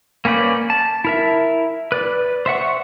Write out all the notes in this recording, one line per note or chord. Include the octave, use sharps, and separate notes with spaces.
A#3 C#4 B4 D5 G6
A5
E4 A#4 E5
B4 D5
C5 E5 F#5 C#6